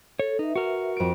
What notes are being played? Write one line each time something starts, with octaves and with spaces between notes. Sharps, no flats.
A4 C#5
D#4 B4 E5
F#4 A#4
F2 D7